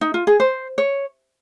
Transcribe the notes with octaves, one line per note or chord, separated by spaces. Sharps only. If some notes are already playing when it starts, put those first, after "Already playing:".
D#4
F4
G#4
C5
C#5